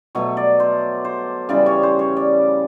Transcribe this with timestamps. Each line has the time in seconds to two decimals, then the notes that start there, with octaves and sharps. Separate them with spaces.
0.15 B2 F#3 A3 C#5
0.37 D5
0.60 C5
1.04 C5
1.49 C#3 E3 G3 D5
1.66 C#5
1.83 C5
1.99 C#5
2.17 D5